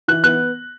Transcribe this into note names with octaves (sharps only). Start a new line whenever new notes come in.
E3 F#6
B3 F#6